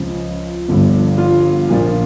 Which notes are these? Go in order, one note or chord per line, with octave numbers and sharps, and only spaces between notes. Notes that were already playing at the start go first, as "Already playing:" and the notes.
Already playing: C#2 C#3 F3
G1 G2 D3 F3
F4
A#1 A#2 F3